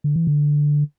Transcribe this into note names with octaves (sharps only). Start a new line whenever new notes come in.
D3
E3
D3